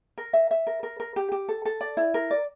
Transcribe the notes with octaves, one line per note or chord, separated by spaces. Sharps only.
A#4
E5
E5
A#4
A#4
A#4
G4
G4
A4
A4
D5
E4
A#4
D5